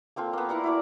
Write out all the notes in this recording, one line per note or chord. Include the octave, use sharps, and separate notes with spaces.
A#3 C4 F4 A4
A#3 B3
E4 A#4 F#5 A#5
E4 F#4 D5